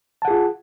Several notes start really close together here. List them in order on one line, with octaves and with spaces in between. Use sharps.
A5 F#5 G#4 F4